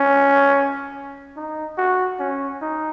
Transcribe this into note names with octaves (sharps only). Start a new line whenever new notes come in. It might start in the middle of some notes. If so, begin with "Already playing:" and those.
Already playing: C#4
D#4
F#4
C#4
D#4